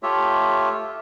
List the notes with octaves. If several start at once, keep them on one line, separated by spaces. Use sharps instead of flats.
A3 F4 G4 C#5 E5